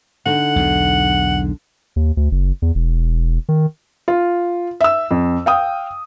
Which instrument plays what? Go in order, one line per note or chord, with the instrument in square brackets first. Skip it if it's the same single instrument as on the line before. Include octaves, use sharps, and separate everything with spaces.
[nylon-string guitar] D3 D#4 [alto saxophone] F#5
[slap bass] B1 E2 B2
[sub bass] D#2
D2
F#1
E2
E1
D#3
[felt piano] F4
E5 E6
F2
F5 G5 D#6